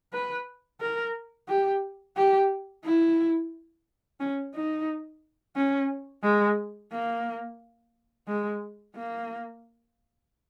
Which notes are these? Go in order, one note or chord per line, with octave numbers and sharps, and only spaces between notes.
B4
A#4
G4
G4
E4
C#4
D#4
C#4
G#3
A#3
G#3
A#3